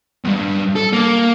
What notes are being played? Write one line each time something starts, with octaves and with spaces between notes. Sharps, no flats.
E2 G2
A4
A#3